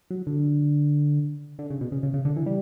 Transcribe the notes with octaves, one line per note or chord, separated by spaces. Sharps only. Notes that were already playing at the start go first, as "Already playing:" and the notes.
F#3
D3
D3
C#3
B2
C#3
C#3
C#3
D3
E3
G3